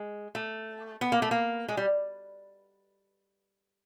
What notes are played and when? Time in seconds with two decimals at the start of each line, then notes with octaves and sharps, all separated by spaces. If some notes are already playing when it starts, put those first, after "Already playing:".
Already playing: G#3
0.35 A3
1.01 B3
1.12 A#3
1.22 A3
1.31 A#3
1.68 G#3
1.77 G3